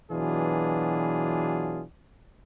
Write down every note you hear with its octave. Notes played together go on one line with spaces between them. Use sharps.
B2 E3 F#3 D4 F4 G#4